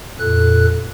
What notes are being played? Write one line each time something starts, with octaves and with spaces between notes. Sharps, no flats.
F2 A#2 A4 F#6